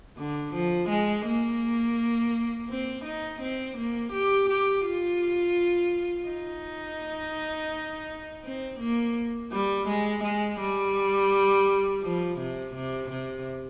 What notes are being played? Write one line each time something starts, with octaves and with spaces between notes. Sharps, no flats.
D3
F3
G#3
A#3
C4
D#4
C4
A#3
G4
G4
F4
D#4
C4
A#3
G3
G#3
G#3
G3
F3
C3
C3
C3